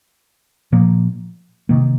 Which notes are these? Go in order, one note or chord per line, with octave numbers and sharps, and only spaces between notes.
A#2 F3 A#3
C3 D#3 A#3